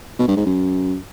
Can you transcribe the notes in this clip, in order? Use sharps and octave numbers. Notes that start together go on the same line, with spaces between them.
B2
G2
G#2
F#2